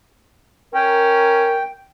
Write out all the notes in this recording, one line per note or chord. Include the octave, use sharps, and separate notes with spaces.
C#4 A#4 G5